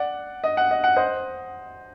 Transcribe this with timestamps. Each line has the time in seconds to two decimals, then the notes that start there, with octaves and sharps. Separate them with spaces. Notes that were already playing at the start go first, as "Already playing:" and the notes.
Already playing: D5 F#5
0.44 D#5
0.57 F#5
0.71 D#5
0.84 F#5
0.96 C5 D#5